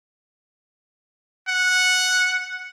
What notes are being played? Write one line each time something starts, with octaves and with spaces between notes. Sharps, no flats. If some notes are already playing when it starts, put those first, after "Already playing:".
F#5